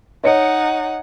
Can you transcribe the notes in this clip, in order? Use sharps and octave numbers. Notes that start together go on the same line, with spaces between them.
D#4 C#5 D#5 F#5 C#7